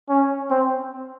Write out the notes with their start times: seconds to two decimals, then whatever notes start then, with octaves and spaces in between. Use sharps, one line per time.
0.09 C#4
0.50 C4